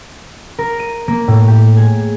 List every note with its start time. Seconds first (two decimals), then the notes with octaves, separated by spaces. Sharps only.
0.59 A#4
0.80 D#7
1.08 A#3
1.28 A2
1.48 G4
1.77 G#4